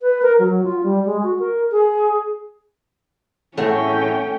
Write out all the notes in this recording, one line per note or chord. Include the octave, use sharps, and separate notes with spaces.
B4
A#4
F#3
F4
G3
G#3
F#4
A#4
G#4
A2 A3 C#4 F#4 G#4 C#5 F#5 G5